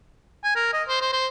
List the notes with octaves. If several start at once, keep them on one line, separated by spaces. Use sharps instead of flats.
G#5
A#4
D#5
C5
C5
C5